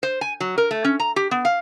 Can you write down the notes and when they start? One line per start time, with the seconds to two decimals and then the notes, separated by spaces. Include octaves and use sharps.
0.03 C5
0.21 G#5
0.40 F#3
0.58 A#4
0.71 A3
0.84 C#4
1.00 A#5
1.16 G4
1.31 B3
1.45 F5